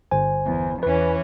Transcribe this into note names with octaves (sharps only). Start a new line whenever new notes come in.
G1 C5 G#5
E2
E2 E3 C#4 B4